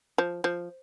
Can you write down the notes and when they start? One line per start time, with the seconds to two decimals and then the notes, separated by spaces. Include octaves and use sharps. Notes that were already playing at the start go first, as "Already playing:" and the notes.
0.18 F3
0.44 F3